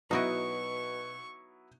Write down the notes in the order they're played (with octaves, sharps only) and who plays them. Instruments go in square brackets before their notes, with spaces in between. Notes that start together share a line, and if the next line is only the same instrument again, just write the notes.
[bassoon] B2 [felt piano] F#3 B3 E4 [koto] D#4 F#4 D#5 [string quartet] C#6